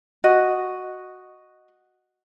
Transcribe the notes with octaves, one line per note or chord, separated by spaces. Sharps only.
F#4 D#5